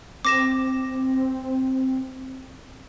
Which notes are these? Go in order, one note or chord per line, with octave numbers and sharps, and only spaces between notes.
C4 D6 A#6 E7